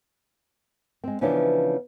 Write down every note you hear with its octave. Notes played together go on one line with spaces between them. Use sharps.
G#3 C4
C#3 E3 F3 B3 C#4 D4